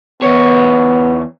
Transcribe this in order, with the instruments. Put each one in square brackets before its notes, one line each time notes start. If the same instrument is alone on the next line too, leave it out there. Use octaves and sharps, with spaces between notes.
[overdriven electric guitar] E2 C#5 [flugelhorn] B3